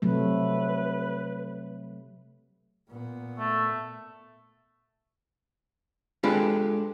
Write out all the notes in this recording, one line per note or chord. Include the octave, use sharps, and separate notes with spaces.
C3 F#3 A3 B4
A#2 B3
A3
G#3 D4 F4 G4 A4 B4